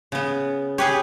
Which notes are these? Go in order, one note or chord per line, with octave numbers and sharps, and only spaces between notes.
C#3 B3
G4 G#4 B4 C#5